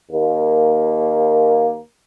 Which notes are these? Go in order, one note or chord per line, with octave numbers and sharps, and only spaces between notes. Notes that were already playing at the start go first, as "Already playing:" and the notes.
D#2 A#3